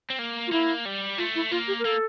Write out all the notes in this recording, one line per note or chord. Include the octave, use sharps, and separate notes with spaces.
C4
A#3
F4
A#3 E4
G3
A3 F4
E4
A#3 F4
G4
A#4
A#3 A4